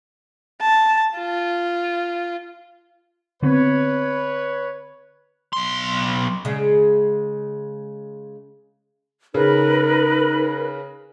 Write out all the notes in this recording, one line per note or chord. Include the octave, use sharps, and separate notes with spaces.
A5
F4
D3 B3 C4 B4 C#5
B1 C6
C#3 G#3
C#3 D#4 A#4 B4